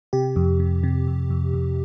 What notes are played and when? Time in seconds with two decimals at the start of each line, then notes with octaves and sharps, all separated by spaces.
0.13 C3 G4
0.36 F2
0.60 C3
0.83 C3
1.07 F2
1.30 F2
1.54 F2